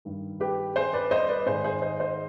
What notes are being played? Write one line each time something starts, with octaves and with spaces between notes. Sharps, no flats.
G2 D#3
G4 B4
G#4 C5
B4 D5
C5 D#5
B4 D5
G#2 D#3 G#4 C5
G#4 C5
C5 D#5
C5 D#5